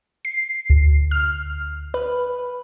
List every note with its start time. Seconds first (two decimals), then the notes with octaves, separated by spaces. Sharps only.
0.25 C7
0.70 D2
1.11 F6
1.94 B4